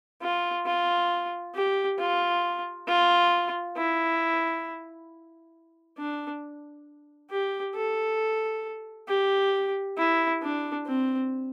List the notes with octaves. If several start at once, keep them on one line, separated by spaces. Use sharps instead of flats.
F4
F4
G4
F4
F4
E4
D4
G4
A4
G4
E4
D4
C4